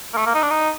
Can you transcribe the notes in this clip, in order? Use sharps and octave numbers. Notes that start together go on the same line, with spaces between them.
A#3
A3
A#3
D#4
D4
D#4